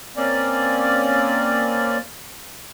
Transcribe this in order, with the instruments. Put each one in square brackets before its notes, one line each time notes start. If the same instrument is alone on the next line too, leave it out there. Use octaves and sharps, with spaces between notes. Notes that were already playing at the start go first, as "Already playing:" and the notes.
[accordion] A#3 C4 C#4 D5